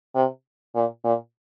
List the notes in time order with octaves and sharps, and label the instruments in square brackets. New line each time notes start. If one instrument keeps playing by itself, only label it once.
[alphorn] C3
A#2
A#2